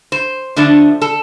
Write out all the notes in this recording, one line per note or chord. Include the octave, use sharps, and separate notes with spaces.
C5
D3 F3 A3 D4
A4